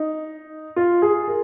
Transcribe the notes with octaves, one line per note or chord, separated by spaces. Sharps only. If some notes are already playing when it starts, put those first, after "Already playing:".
Already playing: D#4
F4
G#4
A#4